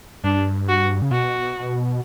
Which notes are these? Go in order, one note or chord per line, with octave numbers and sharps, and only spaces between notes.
G2 D4
F#4
C#3
B2 F#4